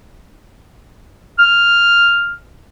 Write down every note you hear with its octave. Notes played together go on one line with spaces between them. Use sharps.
F6